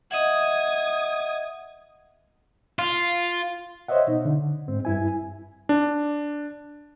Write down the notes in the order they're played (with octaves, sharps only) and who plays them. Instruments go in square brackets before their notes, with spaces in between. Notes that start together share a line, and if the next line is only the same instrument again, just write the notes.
[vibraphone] D#5 E5 F#5 [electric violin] D#6 G#6
[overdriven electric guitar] F4
[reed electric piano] C5 C#5 D#5 E5 F#5
B2 D#4
D3
G#2 C4
G2 E4 G#5
[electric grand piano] D4